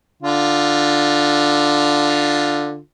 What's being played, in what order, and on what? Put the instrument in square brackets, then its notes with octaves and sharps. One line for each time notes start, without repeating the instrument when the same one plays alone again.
[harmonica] D3 F4